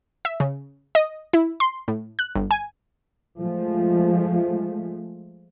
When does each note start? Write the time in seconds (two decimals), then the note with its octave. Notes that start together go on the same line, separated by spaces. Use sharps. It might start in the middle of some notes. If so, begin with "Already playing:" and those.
0.25 E5
0.40 C#3
0.95 D#5
1.33 E4
1.60 C6
1.88 A2
2.19 F#6
2.36 G1
2.51 G#5
3.39 F3 G#3 A3